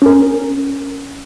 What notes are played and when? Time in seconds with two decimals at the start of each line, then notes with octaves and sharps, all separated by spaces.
0.02 C#4 A#4